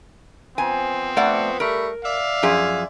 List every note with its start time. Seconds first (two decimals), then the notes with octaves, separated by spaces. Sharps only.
0.58 F3 B3 C4 G#5
1.17 A3 D5 F#5
1.60 G3 A3 A#4 B5
2.04 D5 E5 F5
2.43 F#2 F3 G#4